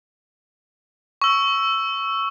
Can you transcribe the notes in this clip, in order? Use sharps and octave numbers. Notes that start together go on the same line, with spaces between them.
C#6 E6